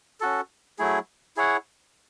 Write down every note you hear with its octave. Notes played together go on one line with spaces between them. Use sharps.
C#4 F#4 A4
F#3 A3 E4 G#4
E4 G#4 C#5 F#5